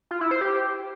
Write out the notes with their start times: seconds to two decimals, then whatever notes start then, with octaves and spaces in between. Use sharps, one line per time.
0.11 F4
0.21 E4
0.31 C5
0.41 G4